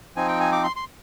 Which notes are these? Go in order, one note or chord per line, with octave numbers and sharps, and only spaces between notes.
F3 C4 D#4 G#5
G5
G#5
D6
C6
C6